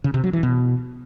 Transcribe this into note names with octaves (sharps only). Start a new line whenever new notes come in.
C#3
C3
F#3
E3
B2